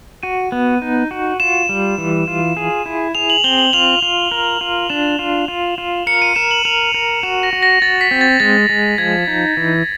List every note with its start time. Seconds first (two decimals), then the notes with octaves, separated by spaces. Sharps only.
0.23 F#4 D#7
0.52 B3
0.82 D#4
1.11 F#4
1.40 F4 E7
1.69 G3
1.98 E3
2.28 F4
2.57 G#4
2.86 E4
3.15 G#4 F7
3.30 F#7
3.44 C4 G7
3.58 F#7
3.73 F4 F7
4.02 F4
4.32 A#4
4.61 F4
4.89 D4 E7
5.19 F4
5.48 F4
5.78 F4
6.07 A#4 C#7
6.22 D#7
6.36 A#4 E7
6.51 F#7
6.65 A#4 F7
6.94 A#4
7.23 F#4 E7
7.43 A#6
7.53 F#4
7.63 A#6
7.82 F#4 A6
8.01 B6
8.11 C4
8.21 A6
8.40 G#3 A6
8.69 G#3
8.98 F3 G#6
9.28 D#4
9.57 E3